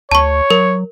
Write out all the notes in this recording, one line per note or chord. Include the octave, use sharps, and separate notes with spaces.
D2 C#5 A5 C#6
F#3 A#4